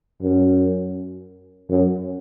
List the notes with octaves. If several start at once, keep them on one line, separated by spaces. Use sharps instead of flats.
F#2
F#2